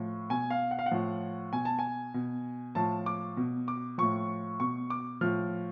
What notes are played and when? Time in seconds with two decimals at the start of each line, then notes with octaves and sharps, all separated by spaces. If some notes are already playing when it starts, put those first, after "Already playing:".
Already playing: A2 F3
0.30 B2 G#5
0.50 F5
0.71 F#5
0.79 F5
0.86 F#5
0.91 A2 F3
1.52 B2 G#5
1.65 A5
1.79 G#5
2.14 B2
2.75 A2 F3 A5
3.06 D6
3.37 B2
3.68 D6
3.98 A2 F3 C#6
4.60 B2 C#6
4.90 D6
5.21 A2 F3 F6